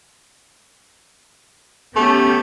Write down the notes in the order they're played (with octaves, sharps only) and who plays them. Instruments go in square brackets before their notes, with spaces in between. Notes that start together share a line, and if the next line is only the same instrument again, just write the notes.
[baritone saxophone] A3 [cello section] B3 C#4 G4